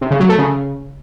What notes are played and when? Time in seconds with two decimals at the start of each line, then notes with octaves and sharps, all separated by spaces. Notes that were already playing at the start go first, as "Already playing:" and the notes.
0.01 C3
0.11 C#3
0.20 F#3
0.29 A3
0.38 C#3